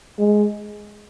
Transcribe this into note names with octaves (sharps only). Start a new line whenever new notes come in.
G#3